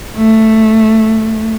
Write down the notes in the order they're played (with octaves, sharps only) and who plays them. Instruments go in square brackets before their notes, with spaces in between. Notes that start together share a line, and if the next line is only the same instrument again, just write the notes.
[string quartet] A3